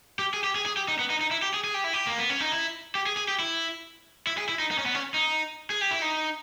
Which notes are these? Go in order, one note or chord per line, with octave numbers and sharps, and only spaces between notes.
G4
G#4
G4
G#4
G#4
G4
D#4
B3
D#4
D#4
E4
G4
G#4
G#4
G4
E4
G4
A#3
B3
C#4
D#4
E4
G4
G#4
G#4
G4
E4
E4
G#4
E4
D#4
D#4
C#4
B3
C#4
D#4
G#4
G4
E4
D#4